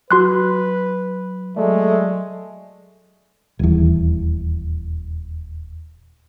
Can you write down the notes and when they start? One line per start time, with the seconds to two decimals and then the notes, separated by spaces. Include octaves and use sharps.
0.11 F#3 F#4 B4 C6 F#6
1.57 F#3 G#3 A3 D5
3.59 D#1 E2